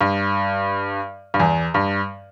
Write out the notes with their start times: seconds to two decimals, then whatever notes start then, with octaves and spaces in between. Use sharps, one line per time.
0.01 G2
1.34 G2
1.40 E2
1.74 G2